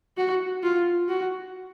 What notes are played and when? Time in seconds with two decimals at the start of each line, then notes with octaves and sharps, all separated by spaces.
0.17 F#4
0.63 F4
1.09 F#4